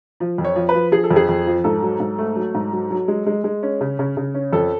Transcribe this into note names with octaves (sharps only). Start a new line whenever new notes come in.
F3
F2
C#5
F3
B4
F3
F3 G#4
A4
F2
G#4
F2
F3
G#2 A4
F#3
G#2
A3
F#3
G#2
F#3
F#3
G#3
G#3
G#3
C#4
C#3
C#3
C#3
C#4
F2 A4